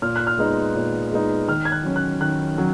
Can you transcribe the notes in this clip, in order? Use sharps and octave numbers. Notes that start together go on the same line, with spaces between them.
A#2 F6
F#6
F6
G#3 B3 D#4
A#2
G#3 B3 D#4
D#3 F6
G#6
F#6
F#3 C#4
F#6
D#3 F#6
F#3 C#4